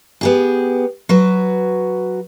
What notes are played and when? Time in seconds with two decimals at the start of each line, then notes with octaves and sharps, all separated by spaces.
0.21 B3 G4 G#4
1.09 F#3 F#4 B4